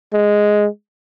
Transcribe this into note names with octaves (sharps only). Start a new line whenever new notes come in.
G#3